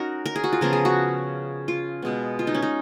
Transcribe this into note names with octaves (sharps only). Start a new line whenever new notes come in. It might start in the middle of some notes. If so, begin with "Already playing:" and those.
Already playing: C#4 D#4 F#4 A#4
A#4
G#4
F#4
F4
C#3 F3 B3 A#4
G#4
F#4
F4
B2 G#3 B3
F4
D#4
C#4
D#4